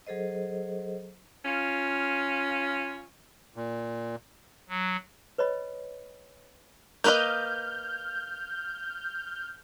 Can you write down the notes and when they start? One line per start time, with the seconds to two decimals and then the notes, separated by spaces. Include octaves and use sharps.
0.07 F#3 G#4 A4 C5 D#5
1.45 C#4 F4
3.56 A#2
4.69 F#3
5.38 B4 C#5 D#5 B5
7.04 A#3 B4 D#5 F6 G6